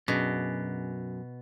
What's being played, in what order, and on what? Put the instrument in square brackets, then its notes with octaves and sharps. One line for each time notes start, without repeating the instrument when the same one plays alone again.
[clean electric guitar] F#2 [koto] B2 [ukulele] C#4 D4 G#4